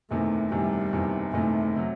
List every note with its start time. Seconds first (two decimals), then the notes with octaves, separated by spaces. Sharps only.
0.10 F#1 E2 C3 D#3 A3
0.51 F#1 E2 C3 D#3 G3
0.93 F#1 E2 C3 D#3
1.33 F#1 E2 C3 D#3 A3
1.76 C3 F#3